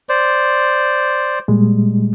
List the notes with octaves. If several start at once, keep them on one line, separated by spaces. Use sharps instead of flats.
C5 D5
A#2 G3 G#3